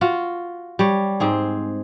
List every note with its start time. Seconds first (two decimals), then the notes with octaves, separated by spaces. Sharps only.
0.01 F4 F#4
0.79 G3 C#5
1.20 G#2 C4 G#4